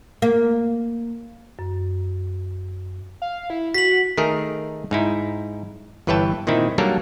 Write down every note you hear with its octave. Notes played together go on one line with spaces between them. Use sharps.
A#3
F#2
F5
E4
F#4 B6 F#7
D#3 A3 G#4 A#4
G#2 D#4 E4
G1 E3 B4 C#5 G5 A5
A#2 D#3 C4 D#4 E4
F#3 G3 A#3 D4 A4 A#4